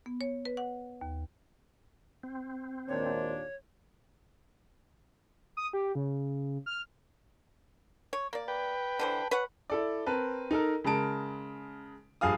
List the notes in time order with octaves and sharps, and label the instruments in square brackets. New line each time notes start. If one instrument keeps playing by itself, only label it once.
[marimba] B3
C#5
B4
F#5
D#2
[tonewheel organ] C4
[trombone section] G#1 D#3 C5 [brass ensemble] D#2 A#2 D4 [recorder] C#5
[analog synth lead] D#6
G4
C#3
F6
[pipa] C#5
A#3 D5
[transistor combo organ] B4 G5
[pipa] D3 E3 C5
B4 C#5 F#5
[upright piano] E4 A4 D5
C4 A#4 B4 A5
D#4 A4 A#4
C#3 G#3 A#4 A5 D7
A#1 G2 G#4 F5 D#6